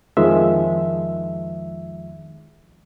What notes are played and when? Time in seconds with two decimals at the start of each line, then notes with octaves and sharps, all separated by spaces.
0.17 F2 D#3 F3 G#3 E5